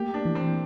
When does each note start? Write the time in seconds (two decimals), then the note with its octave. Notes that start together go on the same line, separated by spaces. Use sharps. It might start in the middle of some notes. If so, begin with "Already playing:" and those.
Already playing: A3 A#3 G4
0.14 D4
0.25 E3
0.35 C4